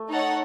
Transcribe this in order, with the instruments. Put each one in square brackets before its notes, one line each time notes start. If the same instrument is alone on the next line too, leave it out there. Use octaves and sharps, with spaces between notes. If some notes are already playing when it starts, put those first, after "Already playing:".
Already playing: [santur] A3
[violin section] D#4 A4 C#5 F#5